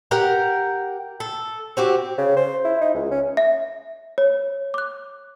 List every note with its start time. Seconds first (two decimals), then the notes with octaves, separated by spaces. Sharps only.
0.11 G4 A#4 F#5 G5
1.20 A4
1.77 C4 F#4 G4
2.18 C#3
2.36 C5
2.65 E4
2.81 D#4
2.94 C#2
3.11 C#4
3.37 E5
4.18 C#5
4.74 D6 F#6